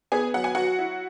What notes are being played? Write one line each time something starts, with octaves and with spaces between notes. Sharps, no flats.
B3 G#4 G#5
F#3 F#5
G#5
F#3 F#4 F#5
E4